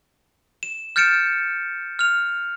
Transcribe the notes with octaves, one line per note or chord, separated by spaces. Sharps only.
E7
F6 G6 A6 C#7 D7 E7
F6 F7